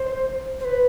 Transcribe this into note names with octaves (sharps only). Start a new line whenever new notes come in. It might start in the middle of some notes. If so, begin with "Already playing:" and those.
Already playing: C5
C5
B4